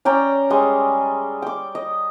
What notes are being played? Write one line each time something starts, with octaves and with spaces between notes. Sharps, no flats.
C#4 D5 G5 A#5
G3 G#3 G#5
G5 D6
D#5